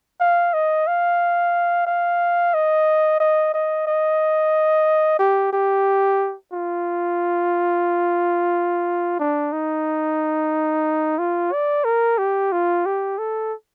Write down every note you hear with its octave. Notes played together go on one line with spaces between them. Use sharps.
F5
D#5
F5
F5
D#5
D#5
D#5
D#5
G4
G4
F4
D4
D#4
F4
D5
A#4
G4
F4
G4
A4